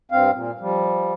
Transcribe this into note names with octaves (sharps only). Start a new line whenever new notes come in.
G2 C4 F5
A#2
F3 G3